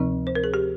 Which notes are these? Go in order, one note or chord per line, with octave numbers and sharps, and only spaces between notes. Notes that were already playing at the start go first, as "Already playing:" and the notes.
Already playing: D2 C3 F3 C4 D#4
C5
A#4
G#4
G4